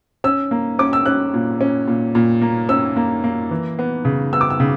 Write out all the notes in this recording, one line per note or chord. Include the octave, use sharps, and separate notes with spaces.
C#4 E6
A#3
C#4 D6
E6
C#4 F#6
A#2
C#4
A#2
A#2
A#3
C#4 E6
A#3
A#3
E3
B3
C#3
B3 E6
D6
E6
C#3